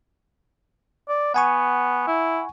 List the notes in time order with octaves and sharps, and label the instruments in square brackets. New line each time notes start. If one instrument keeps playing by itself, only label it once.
[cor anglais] D5
[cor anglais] B3 [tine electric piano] F#5 G#5 C#6
[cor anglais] E4